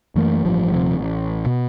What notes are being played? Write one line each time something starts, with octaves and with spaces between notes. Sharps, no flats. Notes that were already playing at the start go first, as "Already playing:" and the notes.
F#2 E3 A3 A#3
A1 G2 F3
D#1 C3 F3 C4
A1
B2